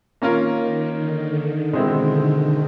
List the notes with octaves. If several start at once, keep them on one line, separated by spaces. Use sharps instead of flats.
D#3 A#3 C#4 F4 A#4
D3
B2 G#3 C4 E4